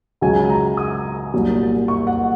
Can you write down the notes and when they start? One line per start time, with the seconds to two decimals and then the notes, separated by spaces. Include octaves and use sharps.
0.21 C#2 C#3 F#3 G#5
0.50 A#5
0.77 D#6
1.34 C2 A#2 F#3
1.88 C#6
2.07 F#5